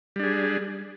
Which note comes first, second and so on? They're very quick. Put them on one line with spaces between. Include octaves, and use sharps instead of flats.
G3 D4 G#4